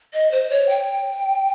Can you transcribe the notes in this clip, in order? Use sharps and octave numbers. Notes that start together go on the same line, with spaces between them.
D#5
C5
C#5
G5